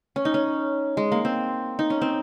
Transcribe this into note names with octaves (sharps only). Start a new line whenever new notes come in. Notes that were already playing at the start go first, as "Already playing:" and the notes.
C#4
D#4
C#4
G#3
A#3
C4
D#4
C#4
C4